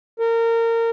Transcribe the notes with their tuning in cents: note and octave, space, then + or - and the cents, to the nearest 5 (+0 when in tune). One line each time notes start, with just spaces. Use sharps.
A#4 -25